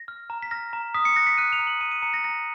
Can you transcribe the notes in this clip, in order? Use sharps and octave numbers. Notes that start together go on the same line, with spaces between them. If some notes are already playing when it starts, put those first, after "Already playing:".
Already playing: A#6
F6
A#5
B6
F6 A#6
A#5
D#6 B6
C#7
F#6 A#6
B6
F#6 D#7
F7
A#5
F#7
A#5 D#7
D#7
A#5 C#7
A#6
A#5 A#6